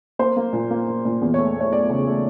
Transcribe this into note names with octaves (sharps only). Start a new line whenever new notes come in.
A#3 C5
A#3
A#2
A#3
A#2
A#2
E2
C#5
A3
A3
C#5
A3 D5
C#3
A3